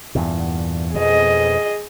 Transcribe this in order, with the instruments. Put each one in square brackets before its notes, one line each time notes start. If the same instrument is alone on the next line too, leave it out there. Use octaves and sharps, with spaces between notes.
[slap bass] E2 G2 A#2
[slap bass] F2 B2 [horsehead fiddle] G#4 D#5